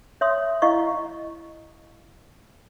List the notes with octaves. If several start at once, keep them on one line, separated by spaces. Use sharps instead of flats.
C#5 E5 C6 D#6
E4 D#5 F5 C#6